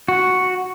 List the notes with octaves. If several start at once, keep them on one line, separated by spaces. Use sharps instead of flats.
F#4